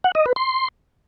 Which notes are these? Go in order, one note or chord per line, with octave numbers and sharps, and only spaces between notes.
F#5
D#5
B4
C6